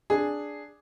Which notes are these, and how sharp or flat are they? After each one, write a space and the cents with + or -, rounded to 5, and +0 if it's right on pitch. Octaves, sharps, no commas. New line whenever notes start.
D4 +0 G#4 +0